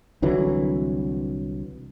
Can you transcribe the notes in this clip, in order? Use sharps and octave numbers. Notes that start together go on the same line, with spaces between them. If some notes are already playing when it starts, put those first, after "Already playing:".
C2 D3 E3 F#3